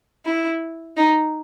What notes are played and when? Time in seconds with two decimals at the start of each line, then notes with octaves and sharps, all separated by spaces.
0.26 E4
0.97 D#4